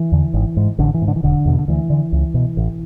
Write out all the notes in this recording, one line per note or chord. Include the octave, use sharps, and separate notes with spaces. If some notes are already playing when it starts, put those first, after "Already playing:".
Already playing: E3
E2 D3
G#1
G#2
A1 D3
E3
G#2
D3
E3
E1 D3
E2 B2
D3
D2 E3
D3
C#2
B2
A1